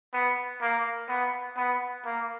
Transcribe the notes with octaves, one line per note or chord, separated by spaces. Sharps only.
B3
A#3
B3
B3
A#3